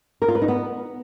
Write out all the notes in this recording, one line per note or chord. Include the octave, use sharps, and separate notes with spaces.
A#4
F4
B4
D#4
B3